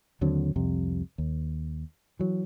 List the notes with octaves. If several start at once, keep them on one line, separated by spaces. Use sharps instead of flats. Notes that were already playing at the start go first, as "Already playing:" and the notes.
D#2 D3 F#3 C4
C2 F2 C3
D#2
E3 F#3